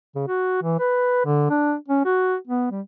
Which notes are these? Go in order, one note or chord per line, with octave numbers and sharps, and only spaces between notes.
C#3
F#4
E3
B4
D3
D4
C#4
F#4
B3
G3